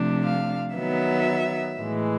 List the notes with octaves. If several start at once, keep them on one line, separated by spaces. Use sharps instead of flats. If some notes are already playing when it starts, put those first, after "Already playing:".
Already playing: C3 F3 A3 D4
F5
D#3 F#3 B3 E5
A2 E3 G#3